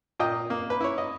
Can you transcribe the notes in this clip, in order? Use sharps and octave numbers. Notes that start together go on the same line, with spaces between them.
A#2 D#5 G5
A#3
B4
E4 C#5
D#5